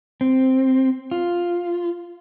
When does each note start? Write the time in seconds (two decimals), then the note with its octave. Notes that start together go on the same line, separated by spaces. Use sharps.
0.21 C4
1.11 F4